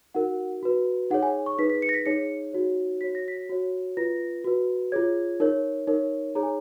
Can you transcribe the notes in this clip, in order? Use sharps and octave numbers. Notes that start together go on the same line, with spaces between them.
D#4 F#4 A#4 F#5
F#4 B4
D#4 G#4 C#5 F#5
G#5
C#6
D#4 G#4 B4 B6
B6
C#7
A#6
B6
D#4 G#4 C#5 C#7
D#4 F#4 C#5
F#4 C#5 B6
A#6
B6
F#4 C#5
F4 B4 A#6
F#4 B4
F4 G#4 C#5 G#6
D#4 A#4 C#5
D#4 A#4 C#5
D#4 G#4 C#5 A#5
G#5